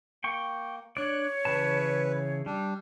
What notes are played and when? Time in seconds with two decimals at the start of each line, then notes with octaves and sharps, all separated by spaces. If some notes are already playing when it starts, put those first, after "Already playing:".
0.24 A#3 G5 C#6
0.97 D4 C#5 D5 F#6
1.45 C#3 E3 B4 A5
2.46 G3 D4